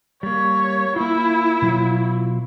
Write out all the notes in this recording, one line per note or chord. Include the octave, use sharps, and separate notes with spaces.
G3 A#3 C#5
A#3 E4 F4
B2 F#3 F4